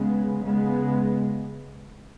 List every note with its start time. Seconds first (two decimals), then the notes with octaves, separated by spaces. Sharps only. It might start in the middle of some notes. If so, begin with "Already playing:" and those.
Already playing: C#3 G#3 B3
0.44 C#3 G#3 B3